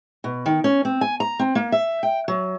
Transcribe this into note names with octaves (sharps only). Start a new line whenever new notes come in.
B2
D#3
C#4
C4
G#5
A#5
C4
A#3
E5
G5
F#3